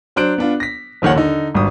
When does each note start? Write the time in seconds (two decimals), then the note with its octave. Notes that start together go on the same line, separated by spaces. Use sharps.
0.16 F#3 D4 C5 F#6 D7
0.38 B3 D4 F4
0.60 A#6 B6
1.02 A#1 D#2 D#3 C#5 F#5
1.15 D3 D#4
1.55 G#1 G2 D#6